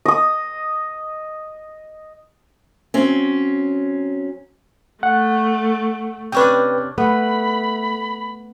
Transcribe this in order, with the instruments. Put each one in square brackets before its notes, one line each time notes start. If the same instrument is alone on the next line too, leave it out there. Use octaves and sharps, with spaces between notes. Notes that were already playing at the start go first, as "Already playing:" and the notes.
[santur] D#5 D#6
[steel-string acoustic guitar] F#3 C4 C#4
[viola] A3 [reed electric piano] F#5
[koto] C3 C#4 D4 [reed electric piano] B4 G5
[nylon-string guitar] A3 [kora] B3 [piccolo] B5